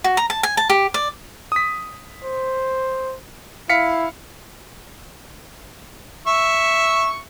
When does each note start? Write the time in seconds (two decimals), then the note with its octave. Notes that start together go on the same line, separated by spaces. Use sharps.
0.04 F#4
0.17 A#5
0.30 A5
0.43 G#5
0.57 A5
0.70 G4
0.94 D5
1.52 D#6 B6
2.25 C5
3.70 E4 F5 B6 C#7
6.27 E5 C#6